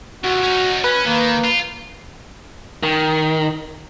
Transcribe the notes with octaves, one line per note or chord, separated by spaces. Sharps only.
C2 F3 F#4
C#4 D#4
C#4 B4
D#3 A#3
F4
D#3